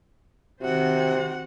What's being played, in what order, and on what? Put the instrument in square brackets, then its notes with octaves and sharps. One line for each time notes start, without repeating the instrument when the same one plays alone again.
[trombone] C3 [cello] D#3 C4 [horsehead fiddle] F#4 F#5